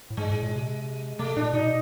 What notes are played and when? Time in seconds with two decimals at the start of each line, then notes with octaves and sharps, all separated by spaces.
0.10 A2
0.17 G#2 G#3
0.31 A2
0.43 A#2
0.56 C3
1.19 C3 A3
1.36 A#2 D4
1.53 B2 D#4